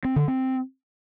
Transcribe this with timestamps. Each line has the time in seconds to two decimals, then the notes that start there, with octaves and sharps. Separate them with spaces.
0.05 C4
0.16 D3
0.28 C4